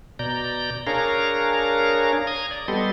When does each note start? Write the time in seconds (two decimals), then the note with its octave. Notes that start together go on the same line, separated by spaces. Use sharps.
0.19 B2 D5 A#5 G6
0.87 D4 G#4 A#4 C#5 F5 A#5
2.27 A#5 D#6 G#6
2.51 D5
2.68 G3 B3 G4 A4 D#5 C6